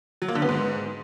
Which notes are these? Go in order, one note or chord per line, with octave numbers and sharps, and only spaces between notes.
F#3
A#3
D3
B3
G#2